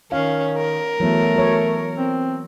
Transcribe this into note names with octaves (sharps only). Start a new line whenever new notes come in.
D#3 C#4 F5
A#4
E3 F#3 A3 B3
F#3 C#5
C4